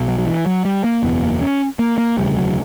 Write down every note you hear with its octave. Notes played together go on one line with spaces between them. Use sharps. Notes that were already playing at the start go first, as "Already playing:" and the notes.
Already playing: B1 B2
F#3
F#3
E3
F#3
G3
A#3
F#1 E2 B2 B3
A#3
C#4
A#3
A#3
E1 D2 C#3 G3
F#3